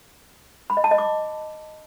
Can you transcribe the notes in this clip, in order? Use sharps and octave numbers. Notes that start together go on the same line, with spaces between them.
B5
D#5
A5
D#5
D6